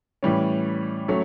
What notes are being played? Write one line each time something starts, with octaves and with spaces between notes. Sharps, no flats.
A2 E3 G3 C#4
F#3 A3 C#4